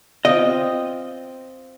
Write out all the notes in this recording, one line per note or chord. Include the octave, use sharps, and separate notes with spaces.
C4 F4 D#5 G5